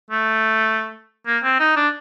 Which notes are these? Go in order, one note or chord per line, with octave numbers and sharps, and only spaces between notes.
A3
A#3
C4
D#4
D4